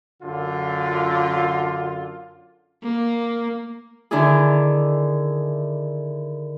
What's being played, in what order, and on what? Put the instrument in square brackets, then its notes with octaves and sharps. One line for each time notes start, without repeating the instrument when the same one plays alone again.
[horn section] F#2 D3 F4
[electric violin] A#3
[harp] D3 D#3 D4 E4 G#4